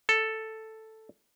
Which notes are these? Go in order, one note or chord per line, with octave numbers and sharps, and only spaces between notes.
A4